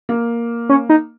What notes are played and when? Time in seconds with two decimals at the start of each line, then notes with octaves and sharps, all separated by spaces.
0.09 A#3
0.69 C#4
0.89 D#4